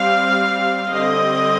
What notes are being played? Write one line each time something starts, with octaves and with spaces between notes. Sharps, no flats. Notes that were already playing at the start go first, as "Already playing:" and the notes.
Already playing: G3 C4 F5
D3 G3 C4 D#5